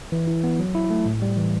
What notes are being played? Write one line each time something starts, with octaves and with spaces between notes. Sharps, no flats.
E3
E4
B3
F#3
E4
A3
A2
G3
E3